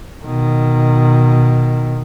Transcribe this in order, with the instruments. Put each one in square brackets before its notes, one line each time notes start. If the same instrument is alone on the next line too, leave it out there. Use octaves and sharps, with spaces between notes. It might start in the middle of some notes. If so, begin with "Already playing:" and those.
[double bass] B2 D#3